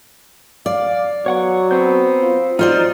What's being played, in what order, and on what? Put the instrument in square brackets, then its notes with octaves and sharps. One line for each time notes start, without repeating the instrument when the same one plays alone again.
[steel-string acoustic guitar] D5 [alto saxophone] F5
[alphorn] F#3 [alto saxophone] B3 [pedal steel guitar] C#5 F#5 C#6
[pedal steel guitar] B3 G6 [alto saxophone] C4
[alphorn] F4
[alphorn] F#3 [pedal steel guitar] D#4 [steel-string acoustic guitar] F4 C5 D5